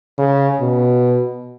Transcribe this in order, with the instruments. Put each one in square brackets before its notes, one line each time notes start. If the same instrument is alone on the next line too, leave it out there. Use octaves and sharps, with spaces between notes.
[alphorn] C#3
B2